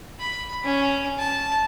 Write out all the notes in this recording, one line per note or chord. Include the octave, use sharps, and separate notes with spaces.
B5
C#4
A5